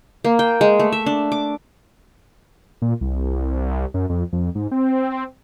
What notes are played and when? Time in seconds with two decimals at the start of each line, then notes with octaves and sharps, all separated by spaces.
0.24 A#3
0.39 G5
0.61 G#3
0.80 A3
0.92 E5
1.06 D4
1.32 D6
2.82 A#2
3.01 C2
3.94 F#2
4.09 F2
4.33 F2
4.55 G#2
4.71 C4